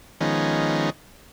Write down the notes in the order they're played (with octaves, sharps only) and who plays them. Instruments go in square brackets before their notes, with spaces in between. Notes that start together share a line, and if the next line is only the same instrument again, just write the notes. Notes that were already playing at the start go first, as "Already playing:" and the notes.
[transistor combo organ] D#3 F3 G#3 B3 C#4 D#4